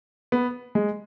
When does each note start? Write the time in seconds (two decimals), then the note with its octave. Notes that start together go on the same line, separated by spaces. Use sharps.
0.32 B3
0.75 G#3